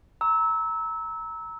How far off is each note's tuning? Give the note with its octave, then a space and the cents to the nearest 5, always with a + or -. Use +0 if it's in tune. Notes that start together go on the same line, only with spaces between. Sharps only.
A#5 +0 C#6 +0 E6 -20